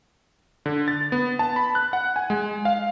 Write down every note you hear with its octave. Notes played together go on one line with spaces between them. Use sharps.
D3
A6
B3
A5
B5
F#6
F#5
G#5
G#3
F5